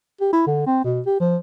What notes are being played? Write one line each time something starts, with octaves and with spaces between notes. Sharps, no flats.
G4
E4
D3
C4
B2
G4
F3